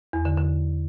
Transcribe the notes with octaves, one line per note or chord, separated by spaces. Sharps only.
E2
D3
D3